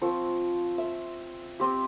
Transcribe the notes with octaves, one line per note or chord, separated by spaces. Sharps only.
F3 C4 C#6 E6
E5
C4 G4